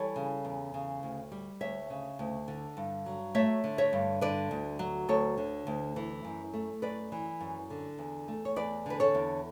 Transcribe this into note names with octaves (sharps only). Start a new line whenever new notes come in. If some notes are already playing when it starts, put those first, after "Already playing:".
Already playing: E3 G3 A4 C#5
C#3
E2
C#3
D2
G3
D2 C#5 E5
C#3
D2
D3
G2
F#3
A3 C#5 E5
D3
C#5 E5
G2
D3 B4 D5
D2
F#3
D2 A4 C#5
D3
D2
E3
F#2
A3
F#2 B4 D5
E3
F#2
D3
E2
A3
C#5
E2 B4 D5
D3 B4
A4 C#5
E2